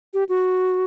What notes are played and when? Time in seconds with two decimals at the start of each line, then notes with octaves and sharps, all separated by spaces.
0.14 G4
0.29 F#4